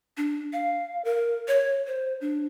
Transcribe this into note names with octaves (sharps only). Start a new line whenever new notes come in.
D4
F5
A#4
C#5
C5
D4